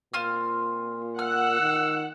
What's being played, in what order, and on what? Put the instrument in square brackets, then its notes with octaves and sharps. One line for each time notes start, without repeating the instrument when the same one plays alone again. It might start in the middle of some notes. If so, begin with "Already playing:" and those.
[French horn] A#2 [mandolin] C4 F4 F6
[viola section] F#5 [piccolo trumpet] E6 [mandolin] F6
[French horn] D#3